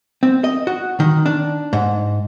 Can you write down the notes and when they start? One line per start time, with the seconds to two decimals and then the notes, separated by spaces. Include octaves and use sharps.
0.23 C4
0.44 D#5
0.67 F#4
1.00 D#3
1.26 D4
1.73 G#2